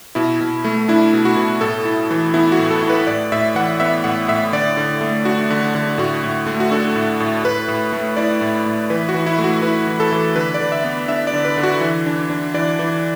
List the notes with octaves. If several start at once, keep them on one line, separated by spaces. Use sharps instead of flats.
B2 E4
B2
A3
D4 E4
B2
F#4
B2
A2 A4
E4
E3
B3 E4
F#4
A2
A4
E4
B4
A2 D5
A2 E5
E3 F#5
B3 E5
A2 F#5
A2 E5
D3 D5
D3
A3
D4 F#4
D3
D3
A2 F#4
A2
A3
F#4
D4 A4
A2
A2
A2 B4
A2
A3
E4 D5
A2
A2
E3 B4
F#4
E3
E4
A3
F#4
E4 B4
E3
A4
E3
D3 B4
D5
D3
E5
B3
D4 E5
D5
D3
B4
D3
F#4
E3
D4
D4
E3 D5
E3